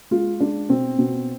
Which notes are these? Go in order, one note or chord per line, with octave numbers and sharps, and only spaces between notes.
G#3 F4
G#3 D4
B2 C4
B2